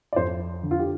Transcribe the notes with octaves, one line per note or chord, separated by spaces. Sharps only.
D5
F2 C5
D3
F4
G4